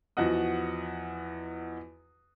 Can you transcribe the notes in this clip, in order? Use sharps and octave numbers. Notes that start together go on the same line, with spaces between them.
E2 F3 F#4 D#5 F#5 D#6